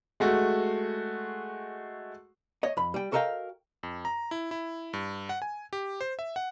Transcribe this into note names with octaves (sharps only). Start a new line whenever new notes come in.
G#3 A3 F#4
C#5 D#5
F2 B5
G3 G5
F#4 A4 A#4 D#5 F5 G5
F2
A#5
E4
E4
G2
F#5
G#5
G4
C5
E5
F#5